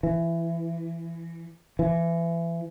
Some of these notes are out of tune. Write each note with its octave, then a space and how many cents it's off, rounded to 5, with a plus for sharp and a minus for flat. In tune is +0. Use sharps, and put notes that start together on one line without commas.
E3 +20
E3 +30